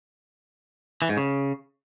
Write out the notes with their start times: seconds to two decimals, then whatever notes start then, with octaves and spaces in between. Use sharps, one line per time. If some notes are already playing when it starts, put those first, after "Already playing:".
1.02 E3
1.09 G#2
1.17 C#3